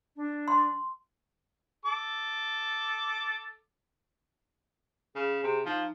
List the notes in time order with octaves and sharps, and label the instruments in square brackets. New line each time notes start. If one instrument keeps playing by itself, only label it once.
[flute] D4
[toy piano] C6
[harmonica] A4 D6
[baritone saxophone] C#3 [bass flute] G#4
[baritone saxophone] C3
[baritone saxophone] F3 [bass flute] D#4